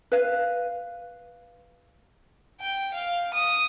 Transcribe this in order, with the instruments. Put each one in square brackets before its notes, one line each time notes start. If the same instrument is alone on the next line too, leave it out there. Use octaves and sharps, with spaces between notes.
[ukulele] B4 F5
[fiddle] G5
F5
D#6